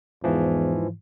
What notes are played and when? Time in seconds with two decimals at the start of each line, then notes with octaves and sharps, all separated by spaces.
0.24 E2 G#2 E3 F3